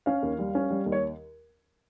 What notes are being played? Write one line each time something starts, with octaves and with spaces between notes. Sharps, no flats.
C#4 F5
D#2
G3
C#4
G3
D#2
C#5